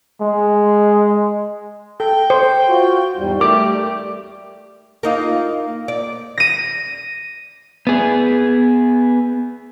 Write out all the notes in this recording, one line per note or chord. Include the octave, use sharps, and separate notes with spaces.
G#3
A4 G5
C5
F4 F#4
E2 G#2 G3
G3 A3 G4 A#4 D6
A#3 D#4 F4
D5
A#6 D#7
B3 G#4